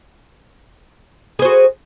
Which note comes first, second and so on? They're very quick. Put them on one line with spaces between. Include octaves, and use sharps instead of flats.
G#4 C5 F#4